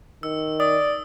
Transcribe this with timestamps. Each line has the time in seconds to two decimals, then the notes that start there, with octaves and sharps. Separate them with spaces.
0.23 D#3 E6
0.60 D5 D#6